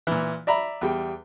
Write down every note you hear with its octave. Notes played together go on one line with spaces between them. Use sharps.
A#2 E3
D5 E5 A#5 B5
E2 G3 G5